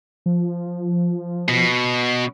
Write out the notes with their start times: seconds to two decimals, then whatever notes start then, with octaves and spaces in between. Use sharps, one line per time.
0.26 F3
1.48 B2